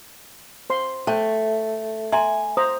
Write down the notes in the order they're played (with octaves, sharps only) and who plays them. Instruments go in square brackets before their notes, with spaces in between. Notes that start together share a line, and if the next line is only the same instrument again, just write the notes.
[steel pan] C5 C6
[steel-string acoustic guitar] A3 [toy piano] C5 A5 C#6 [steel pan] G5
[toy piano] E5 A#5 C6 [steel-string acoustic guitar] G#5
[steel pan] C5 A#5 [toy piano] D#6